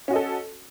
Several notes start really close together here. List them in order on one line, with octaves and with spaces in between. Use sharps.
C#4 F#4 D#5 A4